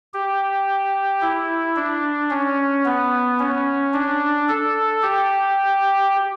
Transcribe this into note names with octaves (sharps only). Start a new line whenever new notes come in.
G4
E4
D4
C#4
B3
C#4
D4
A4
G4